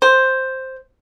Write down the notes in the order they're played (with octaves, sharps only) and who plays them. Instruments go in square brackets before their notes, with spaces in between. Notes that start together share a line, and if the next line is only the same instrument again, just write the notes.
[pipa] C5